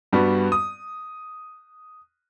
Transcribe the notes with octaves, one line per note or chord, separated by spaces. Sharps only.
G2 G3 B3 F#4
D#6